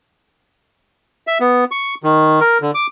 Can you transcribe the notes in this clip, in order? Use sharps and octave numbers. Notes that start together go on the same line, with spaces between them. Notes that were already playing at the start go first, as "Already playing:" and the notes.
E5
B3
C#6
D#3
A#4
D3
D6